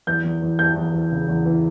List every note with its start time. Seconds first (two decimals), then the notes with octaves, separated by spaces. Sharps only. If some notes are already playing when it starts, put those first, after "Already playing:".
0.07 E2 G6
0.25 E2
0.42 E2
0.59 E2 G6
0.76 E2
0.94 E2
1.12 C#3
1.28 E2
1.45 E3